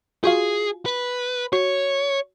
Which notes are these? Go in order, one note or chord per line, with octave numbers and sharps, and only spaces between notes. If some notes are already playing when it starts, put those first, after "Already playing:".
F4 F#4 G#4 F5
B4
F#4 C#5